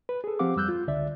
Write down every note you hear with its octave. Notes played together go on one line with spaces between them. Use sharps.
B4
G#4 A4
F3 C4 G4 F5 F#5 D6
F2 G3 E6 F#6 G6
F4
C#2 D3 D5 E5